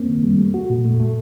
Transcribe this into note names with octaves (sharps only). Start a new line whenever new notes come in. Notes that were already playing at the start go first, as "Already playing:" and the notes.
Already playing: A#3 C4
D#3
G3
A3
F#4
A#2
A3
A3